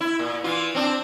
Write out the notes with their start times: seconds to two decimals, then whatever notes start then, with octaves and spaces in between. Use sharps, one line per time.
0.01 E4
0.19 A#2
0.43 E3 F4
0.75 C4 D4